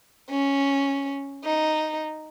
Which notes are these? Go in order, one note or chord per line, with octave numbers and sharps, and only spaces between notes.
C#4
D#4